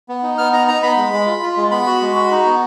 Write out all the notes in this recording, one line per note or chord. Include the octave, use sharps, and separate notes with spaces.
B3
D#4
B3 F6
D#4 A#5
D#4 A#5
B3 B5
G#3
G#3
F4
F4
G#3
B3 B5
F#4
G#3
F#4
D#4
B3